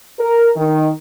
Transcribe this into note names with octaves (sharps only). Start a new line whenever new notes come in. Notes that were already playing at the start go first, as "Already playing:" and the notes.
A#4
D#3